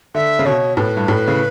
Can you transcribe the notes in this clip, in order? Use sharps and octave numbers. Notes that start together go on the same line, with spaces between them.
D3 E5
C#3
B2 C#5
A2 B4
G2
A2
C#3